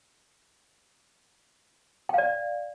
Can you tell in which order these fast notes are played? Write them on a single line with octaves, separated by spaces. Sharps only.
G5 F5 D5